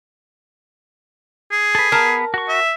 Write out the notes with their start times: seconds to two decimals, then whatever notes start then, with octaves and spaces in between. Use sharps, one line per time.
1.52 G#4
1.75 A4 B4
1.92 B3 A#4 B4 A5
2.34 F#4 C#6
2.49 E5